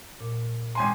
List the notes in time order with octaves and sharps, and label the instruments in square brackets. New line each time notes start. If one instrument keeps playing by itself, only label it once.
[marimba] A#2
[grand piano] G#1 G#5 C6